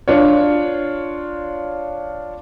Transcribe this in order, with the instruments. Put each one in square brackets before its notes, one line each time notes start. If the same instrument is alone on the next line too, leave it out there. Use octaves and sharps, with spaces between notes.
[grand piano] D4 F4 C#5